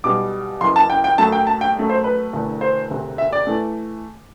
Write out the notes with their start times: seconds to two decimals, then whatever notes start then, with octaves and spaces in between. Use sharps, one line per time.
0.04 B1 B2 G3 D6
0.61 F#1 F#2 E3 C6
0.76 A5
0.90 G5
1.04 G5
1.18 F#2 F#3 A3 A5
1.32 G5
1.47 A5
1.61 G5
1.76 F#2 F#3 A3
1.90 C5
2.04 B4
2.33 E1 E2 D3 A3
2.61 C5
2.90 E1 D2 C3
3.18 E5
3.33 D5
3.47 E3 A3